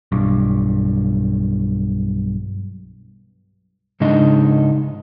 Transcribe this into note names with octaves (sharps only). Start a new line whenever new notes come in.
B1 G2
G#2 C#3 G#3 D4 D#4 D#5